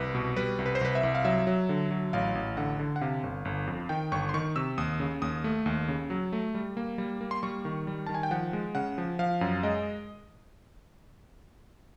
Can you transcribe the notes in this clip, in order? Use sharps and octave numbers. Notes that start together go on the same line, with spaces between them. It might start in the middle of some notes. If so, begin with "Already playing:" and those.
Already playing: C2 B4
B2
G3 B4
C2
B4
C5
C2 B4
E5
C2
F5
F#3 E5
F#3
D3
F#3
A1 F5
A1
D3 F#5
D3
F#5
C3 F5
G1
G1
F2
D#3 G5
G1 C#6
C6
D#3 C#6
C3 E6
D#2 D#6
C#3
D#2 D#6
A3
D#2
C#3
F#3
A3
G3
A#3
G3
A#3
C6
G3 C#6
D#3
G3
D#3 A5
G#5
G5
F3 F#5
G#3
C#3 F#5
F3
F3 F5
F#2
G#3 D#5